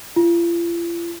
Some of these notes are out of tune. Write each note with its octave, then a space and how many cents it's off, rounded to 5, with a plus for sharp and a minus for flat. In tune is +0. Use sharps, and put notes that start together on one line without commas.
F4 -45